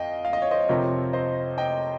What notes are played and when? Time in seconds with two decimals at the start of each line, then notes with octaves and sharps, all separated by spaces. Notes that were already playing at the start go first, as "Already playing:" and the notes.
Already playing: F2 D#5 F5 G5
0.25 F5
0.33 D#5
0.42 C#5
0.51 C5 D#5
0.69 F2 C3 F3 C4 A#4 C#5
1.13 C5 D#5
1.58 D#5 G5